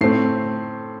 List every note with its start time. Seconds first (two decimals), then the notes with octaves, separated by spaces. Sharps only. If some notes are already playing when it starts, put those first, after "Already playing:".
0.01 A2 A3 C4 C7